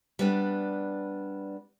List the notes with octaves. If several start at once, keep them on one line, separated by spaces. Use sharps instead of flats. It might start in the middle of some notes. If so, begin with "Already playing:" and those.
G3 B3 D4